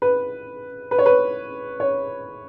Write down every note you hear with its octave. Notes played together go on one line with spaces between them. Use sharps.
B4
B4
C#5
B4
C#5